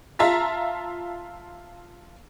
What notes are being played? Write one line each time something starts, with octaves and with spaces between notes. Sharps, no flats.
F4 E5 A5 A#5 B6